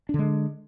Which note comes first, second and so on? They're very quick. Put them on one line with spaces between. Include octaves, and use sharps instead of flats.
D4 D3 G#3